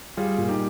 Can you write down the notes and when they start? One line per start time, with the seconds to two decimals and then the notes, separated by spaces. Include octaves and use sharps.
0.17 G3 F4 G#4
0.38 A#2
0.49 D#4 G4